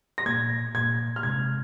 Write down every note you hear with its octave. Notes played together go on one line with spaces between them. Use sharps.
A#6
A#2 A#3 G#6
A#2 A#3 G#6
F6
C3 G#3 C4 G#6